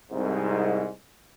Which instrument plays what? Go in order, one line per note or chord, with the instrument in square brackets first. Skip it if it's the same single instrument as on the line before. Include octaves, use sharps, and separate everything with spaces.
[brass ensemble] C2 G#2